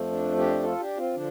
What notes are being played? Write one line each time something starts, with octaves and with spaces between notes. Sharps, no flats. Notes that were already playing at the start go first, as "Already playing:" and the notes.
Already playing: F2 F3 A3
D4
D4 G4
F4 A4
D4 G4
C4 F4
D3 F3 D4